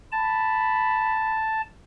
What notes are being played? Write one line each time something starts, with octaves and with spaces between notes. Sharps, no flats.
A5 B5